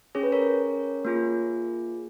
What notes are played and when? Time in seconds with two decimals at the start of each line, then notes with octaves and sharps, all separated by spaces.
0.15 C#4 G#4 C#5
0.23 B4
0.32 A#4 C#5
1.05 A#3 F4 G#4